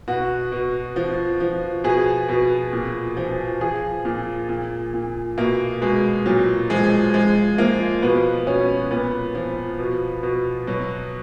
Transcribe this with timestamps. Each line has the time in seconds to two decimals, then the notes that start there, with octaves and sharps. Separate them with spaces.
0.08 B2 F#4
0.52 B2
0.96 F3
1.40 F3
1.84 B2 G#4
2.29 B2
2.72 A#2
3.17 F3
3.61 F3 G#4
4.05 A#2
4.49 A#2
4.94 A#2
5.38 B2 A#3
5.82 B2 G#3
6.26 A#2 F#3
6.70 F3 G#3
7.14 F3 G#3
7.58 F3 A#3
8.02 B2 B3
8.47 B2 C#4
8.91 A#2 B3
9.35 F3
9.79 B2
10.23 B2
10.67 B2 F#3